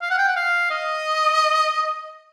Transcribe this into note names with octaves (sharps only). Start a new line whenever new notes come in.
F5
F#5
G5
F#5
F5
D#5